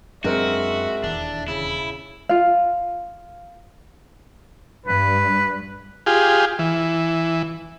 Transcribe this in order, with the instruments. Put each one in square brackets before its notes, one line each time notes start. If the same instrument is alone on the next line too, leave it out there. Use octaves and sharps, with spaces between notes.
[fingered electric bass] F#2 F#3 D4 [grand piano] G#3 C4 A#4 [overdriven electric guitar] F#4 [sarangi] E5
[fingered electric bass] D#1 E2 [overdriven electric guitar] D4
[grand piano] C#3 [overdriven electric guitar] E4
[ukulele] F4 F5
[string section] G2 [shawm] B4
[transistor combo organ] F4 G4 G#4
E3